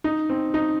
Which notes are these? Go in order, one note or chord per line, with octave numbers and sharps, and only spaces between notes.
D#4
C4
D#4